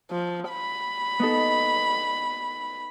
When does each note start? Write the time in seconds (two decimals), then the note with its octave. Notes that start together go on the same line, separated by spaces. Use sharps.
0.11 F3
0.49 B5
1.19 B3 D#4 A4